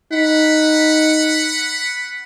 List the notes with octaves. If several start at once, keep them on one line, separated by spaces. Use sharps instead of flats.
D#4 F#5 B5